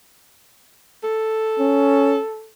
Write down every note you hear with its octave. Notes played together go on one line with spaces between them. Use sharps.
A4
C#4